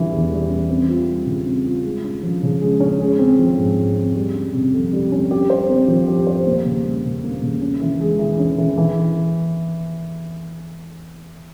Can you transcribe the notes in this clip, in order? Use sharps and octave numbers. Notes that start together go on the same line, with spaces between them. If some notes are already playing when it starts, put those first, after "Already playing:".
Already playing: E3 G3 C#4
E2
G3
C#4
C4
F4
G3
C#3
C4
F4
G#3
C#4
F3
C#3
G#3
C#4
G#3
C4
F3
G#2
G#3
C4
G3
C#4
C3
F2
G3
C#4
G4
C5
C4
F3
G4
C5
A#3
C#3
G3
C#3
A#3
C#3
C#4
E3
G#3
E3
C#4
E3
E3